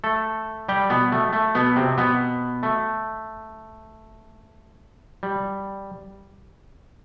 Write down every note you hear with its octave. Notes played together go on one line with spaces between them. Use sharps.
A3 A4
G3 G4
B2 B3
A3
A3
B2 B3
C3 C4
B2 B3
A3
G3